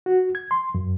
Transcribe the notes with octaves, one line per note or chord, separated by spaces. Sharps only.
F#4
G#6
C6
F#2